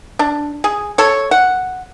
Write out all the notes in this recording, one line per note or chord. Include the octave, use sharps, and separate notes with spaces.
D4
G#4
A4 C#5
F#5